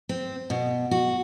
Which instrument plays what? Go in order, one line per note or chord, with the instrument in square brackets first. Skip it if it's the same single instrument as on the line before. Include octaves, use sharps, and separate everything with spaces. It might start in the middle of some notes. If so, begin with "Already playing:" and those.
[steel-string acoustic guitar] C4
B2
F#4